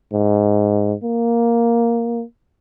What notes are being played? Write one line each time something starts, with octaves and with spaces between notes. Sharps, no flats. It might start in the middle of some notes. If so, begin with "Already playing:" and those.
G#2
A#3